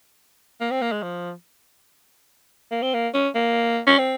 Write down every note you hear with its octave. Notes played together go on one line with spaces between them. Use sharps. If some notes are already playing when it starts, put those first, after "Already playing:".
A#3
C4
A#3
G#3
F3
A#3
C4
A#3
C#4
A#3
C#4
C4